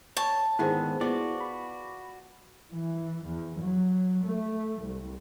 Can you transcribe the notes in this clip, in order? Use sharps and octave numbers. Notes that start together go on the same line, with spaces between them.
C#5 A5
G#2 D3 D#3 B3 E4 G#4 C5
B3 F4 F#4 D5
B5
E3
E2
F#3
A3
C2